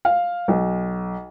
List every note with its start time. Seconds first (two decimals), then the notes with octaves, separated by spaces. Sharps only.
0.05 F5
0.48 B1